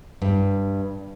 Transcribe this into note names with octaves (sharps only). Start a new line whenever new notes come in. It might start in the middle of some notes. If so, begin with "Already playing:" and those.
G2